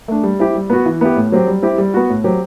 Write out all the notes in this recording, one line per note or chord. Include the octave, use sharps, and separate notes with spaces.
A3 D4
G3
C4 E4 G4
G3
B3 F#4
E3
B3 E4 G4
A2
F#3 C4 G4
G3
C4 E4 G4
G3
B3 F#4
A2
F#3 C4 G4